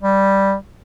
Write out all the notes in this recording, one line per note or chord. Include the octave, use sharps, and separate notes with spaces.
G3